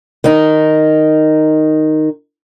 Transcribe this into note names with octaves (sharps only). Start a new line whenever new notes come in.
D#3 D#4